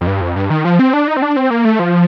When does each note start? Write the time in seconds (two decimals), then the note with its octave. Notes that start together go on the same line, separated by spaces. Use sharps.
0.01 F2
0.07 G2
0.21 F2
0.36 G2
0.50 D#3
0.65 F3
0.79 C4
0.93 D4
1.08 D#4
1.17 C4
1.22 D4
1.36 C4
1.50 A#3
1.65 A3
1.79 F3